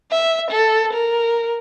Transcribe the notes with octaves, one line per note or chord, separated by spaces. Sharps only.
E5
A4
A#4